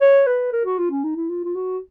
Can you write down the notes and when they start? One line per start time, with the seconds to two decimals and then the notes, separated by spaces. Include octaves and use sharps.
0.01 C#5
0.27 B4
0.53 A#4
0.65 F#4
0.78 F4
0.91 C#4
1.04 D#4
1.16 E4
1.29 F4
1.45 F4
1.55 F#4